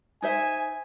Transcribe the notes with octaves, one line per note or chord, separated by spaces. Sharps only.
D#4 C5 E5 G#5